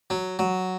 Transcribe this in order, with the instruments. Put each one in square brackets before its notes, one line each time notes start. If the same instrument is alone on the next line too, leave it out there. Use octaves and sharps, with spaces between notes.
[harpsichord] F#3
F#3